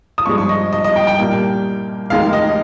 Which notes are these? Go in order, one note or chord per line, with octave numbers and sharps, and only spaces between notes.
D#6
G2 F3 G#3 C#6
C#6
D#5
D#5
D#5
G5
G5
C2 A#2 G3 A#3
F1 D#2 D#3 G#3 F5
D#5